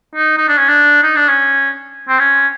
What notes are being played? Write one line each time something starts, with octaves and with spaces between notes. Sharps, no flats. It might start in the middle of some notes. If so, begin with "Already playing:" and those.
D#4
D#4
D4
C#4
D4
D#4
D4
C#4
C4
C#4